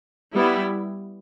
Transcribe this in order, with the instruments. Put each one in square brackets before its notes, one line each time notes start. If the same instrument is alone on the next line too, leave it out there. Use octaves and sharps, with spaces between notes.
[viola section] G3 B3 E4